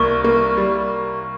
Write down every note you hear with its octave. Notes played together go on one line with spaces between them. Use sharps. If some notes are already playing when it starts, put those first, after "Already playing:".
Already playing: C2 A#3 C#6
A#3
G3